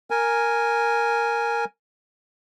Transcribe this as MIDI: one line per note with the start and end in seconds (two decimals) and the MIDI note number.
0.10 1.65 70
0.10 1.65 80